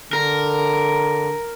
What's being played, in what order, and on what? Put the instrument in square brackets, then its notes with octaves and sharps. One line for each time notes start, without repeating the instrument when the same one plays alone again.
[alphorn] D3 [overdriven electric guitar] A#4